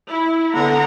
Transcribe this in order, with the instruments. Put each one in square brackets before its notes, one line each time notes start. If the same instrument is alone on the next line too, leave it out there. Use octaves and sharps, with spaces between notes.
[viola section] E4
D3 B3 F#5 A#5